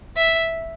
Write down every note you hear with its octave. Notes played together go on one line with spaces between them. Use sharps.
E5